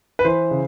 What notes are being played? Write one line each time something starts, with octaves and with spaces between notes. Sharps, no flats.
B4
E3 C5
C#3